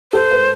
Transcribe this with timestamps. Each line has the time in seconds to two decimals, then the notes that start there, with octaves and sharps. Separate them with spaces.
0.12 A4 C5
0.31 B4